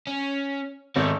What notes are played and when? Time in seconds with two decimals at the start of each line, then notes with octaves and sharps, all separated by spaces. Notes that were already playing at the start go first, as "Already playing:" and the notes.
0.07 C#4
0.96 G#1 D#3 A3